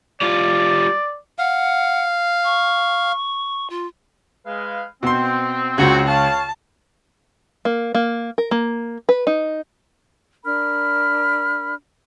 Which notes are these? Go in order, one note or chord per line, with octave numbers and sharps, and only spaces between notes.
G3 F4 D5
F5 F#5
C#6
F4
G#3 B4 F5
B2 C4 C6
C#2 C#3 F#4
C#5 F5 A5
A#3
A#3
A#4
A#3
B4
D#4
D4 A#4 B5 F6